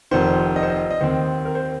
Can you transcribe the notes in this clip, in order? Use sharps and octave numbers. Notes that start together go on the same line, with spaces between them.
F1 F2 D#3 C5
D#5
C5
D#5
D#5
D#2 D#3 C4 C5
A#4
C5